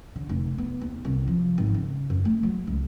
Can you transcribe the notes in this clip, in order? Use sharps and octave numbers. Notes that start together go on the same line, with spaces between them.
D3
F1
B3
D#2
C2
F3
G#1
C#3
F#2
A3
F#3
C#2